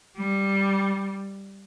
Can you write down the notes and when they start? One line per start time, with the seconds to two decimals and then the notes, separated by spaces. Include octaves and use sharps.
0.18 G3